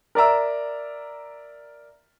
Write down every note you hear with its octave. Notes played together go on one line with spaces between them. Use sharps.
A#4 D5 E5 A#5 E6